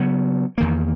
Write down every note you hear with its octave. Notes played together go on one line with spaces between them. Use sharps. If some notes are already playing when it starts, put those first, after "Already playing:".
Already playing: C#3 F#3 B3
E2 D#3 A#3